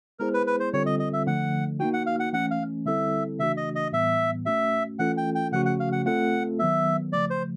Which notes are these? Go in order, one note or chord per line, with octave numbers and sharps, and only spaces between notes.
G#3 B3 E4 G#4 A#4 C5
B4
B4
C5
D3 G3 C4 F4 A4 C#5
D#5
D#5
E5
D3 F3 A3 F#5
A#3 D#4 F#4 G5
F#5
F5
F#5
E3 A3 C#4 F#5
F5
D3 G3 C4 E4 A4 E5
C#3 E3 A3 D4 F#4 E5
D#5
D#5
A2 E3 G3 B3 E5
A3 C#4 F#4 E5
E3 A3 C#4 F4 A4 F#5
G5
G5
C#3 F3 A3 C#4 F#4 F#5
F#5
F5
F#5
A3 C4 F4 A4 F#5
D#3 F#3 B3 E5
C#3 F3 A3 D5
C5